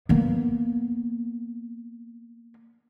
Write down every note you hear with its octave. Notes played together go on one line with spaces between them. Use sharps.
A#3 B3